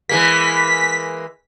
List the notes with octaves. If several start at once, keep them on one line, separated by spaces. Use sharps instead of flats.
E3 G#3 A#3 B6